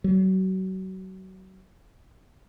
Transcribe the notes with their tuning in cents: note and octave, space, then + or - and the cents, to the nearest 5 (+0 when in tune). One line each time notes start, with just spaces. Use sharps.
F#3 +30